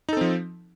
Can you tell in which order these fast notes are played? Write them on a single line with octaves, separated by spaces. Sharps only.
D#4 A4 C4 F3